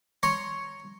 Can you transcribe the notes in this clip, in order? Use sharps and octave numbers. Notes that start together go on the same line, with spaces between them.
C#5 A#5 C6 C#6